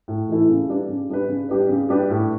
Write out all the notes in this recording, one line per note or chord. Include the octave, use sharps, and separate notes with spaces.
A2
E3 A3 E4 A4
C#3
G3 D4 G4 B4
C#3
G3 D4 G4 B4
C#3
G3 D4 G4 B4
C#3
G3 D4 G4 B4
A2